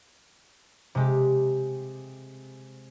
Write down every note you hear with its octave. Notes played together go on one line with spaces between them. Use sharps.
C3 G#3 G4